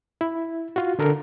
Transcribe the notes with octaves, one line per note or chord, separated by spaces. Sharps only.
E4
F4 F#4
D3 A4 A#4